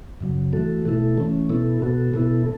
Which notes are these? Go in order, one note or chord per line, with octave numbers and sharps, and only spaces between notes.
F#2 C#3 F#3
E3 A3 F#4 A4
B2 A3 E4 A4
E3 A3 C#4
B2 B3 E4 A4
B2 B3 F#4 A4
B2 B3 E4 A4